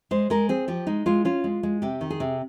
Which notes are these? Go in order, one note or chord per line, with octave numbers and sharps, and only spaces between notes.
G#3 C5
G#3 A#4
C4 G#4
F3 G4
G#3 D#4
G#3 F4
C#4 F4
G#3
G#3
C3 G4
D#3
G#4
C3